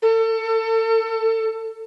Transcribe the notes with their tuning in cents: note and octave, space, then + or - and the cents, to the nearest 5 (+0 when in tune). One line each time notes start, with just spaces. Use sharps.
A4 +30